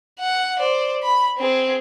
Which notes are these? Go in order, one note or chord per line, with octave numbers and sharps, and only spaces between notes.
F#5
C5 D5
B5
C4 G#4